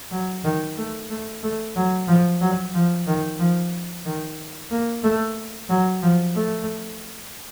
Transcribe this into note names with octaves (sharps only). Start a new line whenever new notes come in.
F#3
D#3
A3
A3
A3
F#3
F3
F#3
F3
D#3
F3
D#3
A#3
A3
F#3
F3
A3